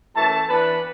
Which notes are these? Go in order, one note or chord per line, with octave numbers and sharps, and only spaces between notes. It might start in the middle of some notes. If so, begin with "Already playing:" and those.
F#2 E3 A3 A5
E3 B3 D4 B4